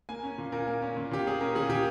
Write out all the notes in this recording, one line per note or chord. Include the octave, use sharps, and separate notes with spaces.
A#3 G#5
C#4
A#2
A#2 A#4
A#3
C#4
A#2
A#2 G4
A#3 G#4
C#4 A#4
A#2 G#4
A#2 G4